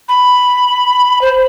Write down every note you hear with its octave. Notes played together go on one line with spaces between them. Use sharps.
B5
C5